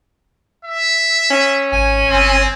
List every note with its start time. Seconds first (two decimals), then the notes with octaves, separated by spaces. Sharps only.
0.65 E5
1.31 C#4
1.72 G#1 G#5
2.09 G1 C4